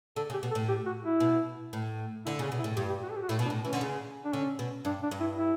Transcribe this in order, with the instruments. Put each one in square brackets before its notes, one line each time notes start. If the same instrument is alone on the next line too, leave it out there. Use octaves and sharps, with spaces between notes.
[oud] D3 [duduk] A4
[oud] C#3
[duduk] G4
[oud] B2
[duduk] A4
[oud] A2
[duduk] G4
F#4
E4
[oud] B2
A2
[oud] D3 [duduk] E4
[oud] C#3 [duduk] C#4
[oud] B2
[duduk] E4
[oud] A2
[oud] G2 [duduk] G4
[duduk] G4
F#4
A4
G4
F#4
[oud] A2 [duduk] E4
[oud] B2
[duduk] D4
[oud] A2
[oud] E3 [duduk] C#4
[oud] D3
C#3
[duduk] D4
[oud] D3 [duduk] C#4
[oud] B2
[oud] G2 [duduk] D4
[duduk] D4
[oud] G2
[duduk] E4
E4